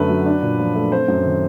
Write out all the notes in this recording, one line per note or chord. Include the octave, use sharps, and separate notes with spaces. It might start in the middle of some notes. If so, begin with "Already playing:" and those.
Already playing: F#2 D3 A3 B4
F#3
D4
A#2
F3
A3
C4 C5
F#2
D#3